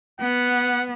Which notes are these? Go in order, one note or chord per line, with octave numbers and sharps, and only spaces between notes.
B3 F#5